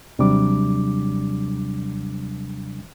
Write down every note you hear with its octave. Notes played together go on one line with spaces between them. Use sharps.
D#2 C3 F#3 G3 D4 D6